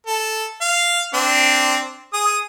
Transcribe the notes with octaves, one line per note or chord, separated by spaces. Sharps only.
A4
F5
C4 D4
G#4 D#6